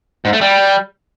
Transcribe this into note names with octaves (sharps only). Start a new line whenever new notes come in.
G#2
A3
G3